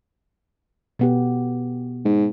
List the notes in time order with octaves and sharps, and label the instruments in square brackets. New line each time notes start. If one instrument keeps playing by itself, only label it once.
[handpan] B2 B3 G4
[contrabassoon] G#2